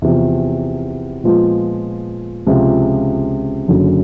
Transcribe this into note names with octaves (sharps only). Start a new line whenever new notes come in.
E2 C3 F3
A#2 F3 G#3 B3
C#2 C3 F3
F#1 F#2 D3 F#3